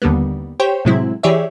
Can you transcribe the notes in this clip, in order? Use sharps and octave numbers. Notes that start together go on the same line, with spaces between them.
D#2 D3 G3 A#3 B3
G4 C5 C#5 G5
A2 C3 F#3 G#3 C4 E4
E3 G4 G#4 C#5 D5 E5